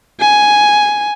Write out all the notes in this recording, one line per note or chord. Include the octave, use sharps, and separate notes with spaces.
G#5